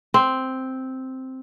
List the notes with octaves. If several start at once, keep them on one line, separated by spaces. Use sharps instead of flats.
C4